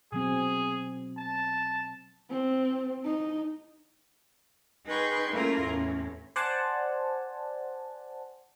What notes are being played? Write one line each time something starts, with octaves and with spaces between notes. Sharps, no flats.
B2 F#3 C4 G#4
A5
C4
D#4
D#4 G#4 B4 G5 C6 C#6
A3 A#3 C#4 E4 F4 A#4
E2 A2 C#4
C5 D5 F#5 G#5 A5